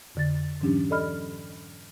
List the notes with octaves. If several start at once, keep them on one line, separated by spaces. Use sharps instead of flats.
F2 D3 A6
G#2 E3 F#3 C#4 D4 G4
A4 D5 D#5 B5 F6